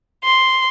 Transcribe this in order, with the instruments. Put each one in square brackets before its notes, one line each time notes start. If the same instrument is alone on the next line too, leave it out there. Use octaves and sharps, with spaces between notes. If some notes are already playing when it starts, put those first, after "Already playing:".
[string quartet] C6